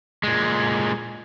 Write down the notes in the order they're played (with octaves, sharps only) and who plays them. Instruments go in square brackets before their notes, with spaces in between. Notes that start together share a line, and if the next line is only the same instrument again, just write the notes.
[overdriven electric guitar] A#2 G#3